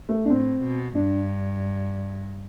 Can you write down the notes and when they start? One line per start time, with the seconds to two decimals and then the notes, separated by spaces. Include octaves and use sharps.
0.09 A3
0.25 D4
0.30 A2 C4
0.62 B2
0.95 G2 D4